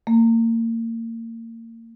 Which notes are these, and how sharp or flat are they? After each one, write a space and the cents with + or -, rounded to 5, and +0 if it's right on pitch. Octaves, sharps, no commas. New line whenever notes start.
A#3 -35